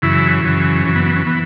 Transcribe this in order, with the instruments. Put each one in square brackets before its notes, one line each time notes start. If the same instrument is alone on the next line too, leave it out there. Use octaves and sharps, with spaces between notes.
[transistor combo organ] F#2 C#3 E3 E4
F#2 C#3 E3
F#2 E3 C#4
B3
B3
C#4
E3 B3